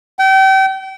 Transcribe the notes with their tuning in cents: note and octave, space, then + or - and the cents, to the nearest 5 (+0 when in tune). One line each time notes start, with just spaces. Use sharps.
G5 -35